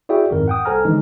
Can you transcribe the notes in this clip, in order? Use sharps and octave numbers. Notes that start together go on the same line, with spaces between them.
E4 F#4 G#4 D5 E5 G5
G#1 F2 G#2 A#4
F#5 G5 D#6
C2 A4 C5 G#5 A#5 F6
D3 E3 G#3 D#4